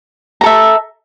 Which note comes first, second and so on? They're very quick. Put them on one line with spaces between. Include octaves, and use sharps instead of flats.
A#5 A4 E5